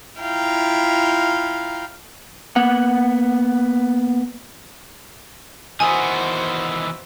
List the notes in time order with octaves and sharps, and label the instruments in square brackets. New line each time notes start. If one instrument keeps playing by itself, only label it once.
[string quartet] E4 F4 F5 G5 A#5
[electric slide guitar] A#3 B3 F#5
[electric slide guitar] D#3 E3 B3 [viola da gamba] F#4 C5 [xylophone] G#5 D#6